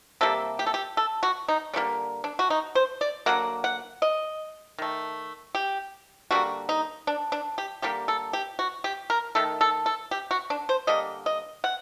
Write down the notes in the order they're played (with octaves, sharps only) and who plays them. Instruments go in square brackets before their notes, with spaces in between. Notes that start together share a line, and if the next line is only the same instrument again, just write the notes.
[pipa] C3 G3 A#3 A4
G4
A4
G4
A4
F#4
D#4
D3 G3 A#3 D4
D4
F#4
D#4
C5
D5
D3 F#3 A#3 F#5
F#5
D#5
D#3 A3
G4
D3 G3 A#3 F#4
D#4
D4
D4
G4
D3 G3 A#3 G4
A4
G4
F#4
G4
A#4
D#3 A3 A4
A4
A4
G4
F#4
D4
C5
D3 G3 A#3 D#5
D#5
F#5